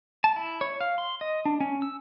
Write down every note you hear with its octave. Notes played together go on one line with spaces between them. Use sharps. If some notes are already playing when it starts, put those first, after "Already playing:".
A5
E4
C#5
F5
C6
D#5
D4
C#4
E6